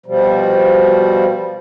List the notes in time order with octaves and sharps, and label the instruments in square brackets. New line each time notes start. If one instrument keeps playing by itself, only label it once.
[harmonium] B2 F3 G3